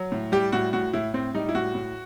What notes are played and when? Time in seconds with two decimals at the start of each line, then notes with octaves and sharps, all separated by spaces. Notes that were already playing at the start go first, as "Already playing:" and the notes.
Already playing: F#3
0.12 A2
0.32 G3 G4
0.52 A2 F#4
0.73 A2 F#4
0.93 A2 E4
1.14 A2 C4
1.34 G3 D#4
1.49 E4
1.55 A2 F#4
1.75 A2